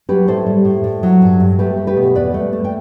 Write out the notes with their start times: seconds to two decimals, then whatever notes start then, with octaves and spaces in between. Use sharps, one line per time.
0.09 F#3 G4 B4
0.28 A2 A4 C5
0.46 G3
0.65 A2
0.84 A2
1.03 F#3
1.22 G2
1.40 G2
1.59 A3 G4 B4
1.77 A3
1.87 G4 B4
1.97 B2
2.15 E2 B4 D5
2.34 A3
2.53 A3
2.64 G5